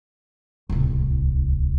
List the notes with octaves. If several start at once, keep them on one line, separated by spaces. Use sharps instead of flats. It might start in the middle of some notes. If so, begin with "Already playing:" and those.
D1 C2